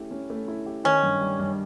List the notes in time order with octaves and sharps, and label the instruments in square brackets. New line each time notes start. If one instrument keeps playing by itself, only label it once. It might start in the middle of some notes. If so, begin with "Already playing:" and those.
Already playing: [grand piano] A3 C#4 E4 G4
C#4
A3
E4
G4
[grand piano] D#3 [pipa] C#4
[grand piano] G2
G3
G2